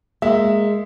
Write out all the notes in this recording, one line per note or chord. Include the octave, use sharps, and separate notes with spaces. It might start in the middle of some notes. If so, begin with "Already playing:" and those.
G#3 A#3 E5